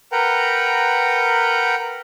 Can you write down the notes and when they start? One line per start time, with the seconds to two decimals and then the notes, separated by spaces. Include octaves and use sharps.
0.12 A#4 B4 F#5 G5 A#5